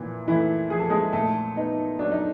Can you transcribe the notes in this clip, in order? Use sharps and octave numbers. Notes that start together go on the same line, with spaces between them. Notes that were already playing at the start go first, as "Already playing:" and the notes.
Already playing: A#2 E3 F3
E3 A3 E4
F3 G#4
A4
G#3 G#4
A#2 A3 A4
B3 D#4
F#3 D4
D#4